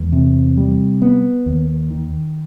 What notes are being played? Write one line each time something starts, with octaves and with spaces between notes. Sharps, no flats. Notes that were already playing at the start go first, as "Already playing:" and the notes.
Already playing: E2 G#3
C3
G3
B3
D#2
D#3